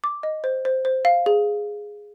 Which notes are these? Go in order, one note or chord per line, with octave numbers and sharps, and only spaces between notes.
D6
D#5
C5
C5
C5
F5
G#4